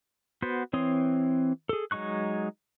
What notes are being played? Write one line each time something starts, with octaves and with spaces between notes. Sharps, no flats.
B3 F#4 C5
E3 C4 C#5 C6 D#6
G#4 A4
F#3 G#3 D#4 C#6 F#6